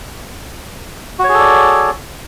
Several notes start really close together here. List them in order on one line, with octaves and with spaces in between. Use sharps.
F#4 C#5 G#4 A4 D5